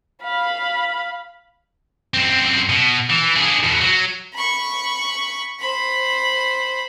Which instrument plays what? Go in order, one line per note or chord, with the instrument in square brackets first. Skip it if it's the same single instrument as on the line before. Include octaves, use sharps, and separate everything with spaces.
[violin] F5 B5
[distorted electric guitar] F#2 C4
B2
E3
D4 G#4
E2 B2
F#3
[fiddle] B5 C#6
C5 B5